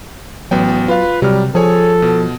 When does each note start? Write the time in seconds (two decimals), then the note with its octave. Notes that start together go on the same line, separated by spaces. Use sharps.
0.51 A1 F#3 B3 G5
0.88 F4 B4 F5
1.22 C3 F#3 G3 F6
1.55 F3 G#4 A4 C#5 G#5
2.02 B2